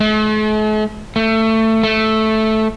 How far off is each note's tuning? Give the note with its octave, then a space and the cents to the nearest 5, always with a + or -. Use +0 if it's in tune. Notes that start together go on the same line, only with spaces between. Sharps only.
A3 -45
A3 +20
A3 -5